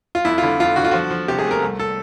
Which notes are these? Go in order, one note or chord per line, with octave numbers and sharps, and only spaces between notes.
F4
F2 E4
F4
D3 E4
F2 F4
D3 F#4
F4
F3 F#4
F3
C3 G4
G#4
A3
A#4
C2
A4